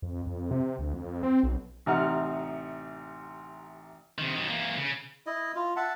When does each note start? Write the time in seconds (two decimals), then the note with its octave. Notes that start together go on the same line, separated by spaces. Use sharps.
0.02 F2
0.26 F2
0.51 C3
0.78 D2
0.93 F2
1.23 C4
1.43 B1
1.86 A1 C3 D#4 F#5 F6
4.18 C3 D#3
4.35 F#2 D#3
4.49 E3 A#3
4.77 C#3
5.26 E4 D#5
5.56 F4
5.76 E5 F#5 A5